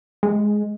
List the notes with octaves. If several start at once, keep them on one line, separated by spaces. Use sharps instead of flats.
G#3